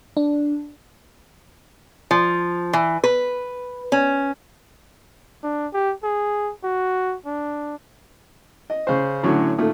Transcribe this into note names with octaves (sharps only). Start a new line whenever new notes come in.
D4
F3
E3
B4
C#4
D4
G4
G#4
F#4
D4
D#5
C#3 C5
A2 D3 F#3 C#4 F#4
A#2 D#3 A3